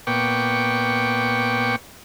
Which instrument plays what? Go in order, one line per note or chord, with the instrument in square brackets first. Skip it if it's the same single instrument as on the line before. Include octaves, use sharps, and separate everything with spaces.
[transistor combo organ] A#2 B3 G5 C#6 D6